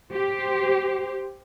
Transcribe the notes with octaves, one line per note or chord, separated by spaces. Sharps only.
G4 C5